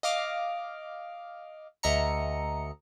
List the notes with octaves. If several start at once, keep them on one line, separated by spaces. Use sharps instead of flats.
D#5 F5 D6 F6
D2 D#5 E5 A#5 C#7